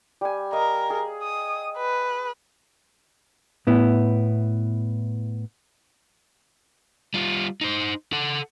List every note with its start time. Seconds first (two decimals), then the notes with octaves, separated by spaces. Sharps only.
0.21 G3 G#5
0.53 A#4 D#5 F5
0.90 G#4
1.22 D#6
1.77 B4
3.67 A2 B3 E4
7.14 G3 F4
7.61 D#4 C5
8.13 A4 F#5